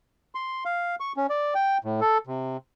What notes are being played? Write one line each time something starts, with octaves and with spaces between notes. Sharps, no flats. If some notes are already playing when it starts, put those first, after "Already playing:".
C6
F5
C#6
C#4
D5
G5
A2
A4
C3